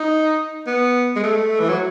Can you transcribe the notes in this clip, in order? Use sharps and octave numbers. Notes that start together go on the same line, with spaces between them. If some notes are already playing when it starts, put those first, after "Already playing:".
Already playing: D#4
B3
G#3
A3
E3
F#3